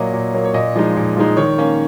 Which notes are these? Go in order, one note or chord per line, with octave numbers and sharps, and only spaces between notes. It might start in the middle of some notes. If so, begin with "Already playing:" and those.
Already playing: A#2 F#3 A#3 D#5
A#2
F#3 A#3
C#5
A#2 D#5
F3 G#3 D#4
A#2
F3 G#3 D#4
D#3 C#5
A#3 C#4